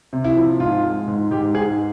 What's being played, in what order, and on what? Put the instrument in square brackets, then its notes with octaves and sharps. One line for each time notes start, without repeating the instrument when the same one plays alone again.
[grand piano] C3
E4
F3
G#2 F4
G#3
G#2
G#2 G4
G#2 G#4